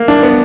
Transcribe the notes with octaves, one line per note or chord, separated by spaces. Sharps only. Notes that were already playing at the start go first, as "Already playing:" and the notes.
Already playing: A#3
D4
B3